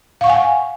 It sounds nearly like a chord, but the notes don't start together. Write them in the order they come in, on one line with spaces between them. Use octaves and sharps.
F5 C#6 F#5 G#5